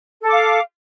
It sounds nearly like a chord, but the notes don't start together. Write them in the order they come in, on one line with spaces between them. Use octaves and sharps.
A4 D6 F5